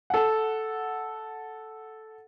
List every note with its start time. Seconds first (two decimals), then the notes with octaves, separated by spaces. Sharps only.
0.10 A4 F#5